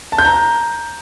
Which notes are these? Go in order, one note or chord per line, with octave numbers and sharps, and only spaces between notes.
A5
G6
A#5